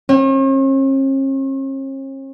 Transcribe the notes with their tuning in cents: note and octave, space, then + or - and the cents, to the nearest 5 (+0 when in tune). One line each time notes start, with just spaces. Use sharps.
C#4 -45